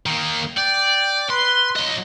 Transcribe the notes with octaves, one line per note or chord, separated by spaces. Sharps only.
D#3 A#3
D5 G5
B4 C6
F#3 D#5